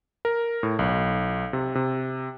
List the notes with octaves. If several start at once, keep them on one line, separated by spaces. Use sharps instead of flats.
A#4
A2
B1
C3
C3